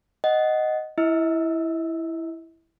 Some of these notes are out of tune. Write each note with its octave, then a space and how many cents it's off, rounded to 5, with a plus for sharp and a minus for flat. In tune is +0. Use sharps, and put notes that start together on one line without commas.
D#5 +0 F#5 +10
E4 +0 D#5 +45 E6 +0